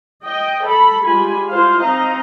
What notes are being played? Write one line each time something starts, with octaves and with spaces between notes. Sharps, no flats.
D#5 G5
A4 B5
G3 G#3 F4 G#5 B5
E4 F4 C5 F5
C4 D#4 D#5 F5 A#5